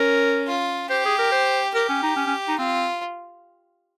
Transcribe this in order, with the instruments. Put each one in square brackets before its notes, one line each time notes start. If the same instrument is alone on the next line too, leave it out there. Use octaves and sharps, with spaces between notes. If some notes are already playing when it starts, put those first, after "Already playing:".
Already playing: [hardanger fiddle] C#4 [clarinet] A#4
[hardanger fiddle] F4
[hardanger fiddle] G4 [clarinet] C5
[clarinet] G#4
A#4
C5
[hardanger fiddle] G4 [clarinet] A#4
[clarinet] C#4
D#4
C#4
C#4
D#4
[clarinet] C4 [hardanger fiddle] F4